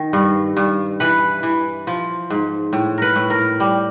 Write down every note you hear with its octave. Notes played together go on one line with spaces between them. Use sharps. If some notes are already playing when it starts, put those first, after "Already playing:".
Already playing: D#3
G2
G2
E3 B4
E3
F3
G#2
A2
A#4 B4
A2
A#4
G3